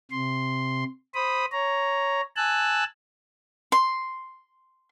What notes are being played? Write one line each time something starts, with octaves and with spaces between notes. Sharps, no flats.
C3 C6
C5 B5 D#6
C#5 A#5
G#5 A5 E6 F#6
C6